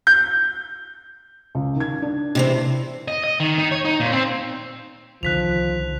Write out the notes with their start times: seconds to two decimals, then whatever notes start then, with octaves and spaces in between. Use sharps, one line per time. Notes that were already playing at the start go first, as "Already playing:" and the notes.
0.07 G6
1.55 C#2
1.76 D#3 G#6
2.02 D4
2.35 C3 E3 C4
3.08 D#5
3.24 D#5
3.40 D#3
3.58 D#4
3.71 C#5
3.85 D#4
4.00 A#2
4.12 C4
5.23 C2 D3 D#3 F3 F#6 B6 F7